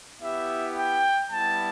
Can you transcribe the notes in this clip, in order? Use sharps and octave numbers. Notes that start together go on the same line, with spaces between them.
B3 E4 G4 E5
G5
G3 B3 E4 A5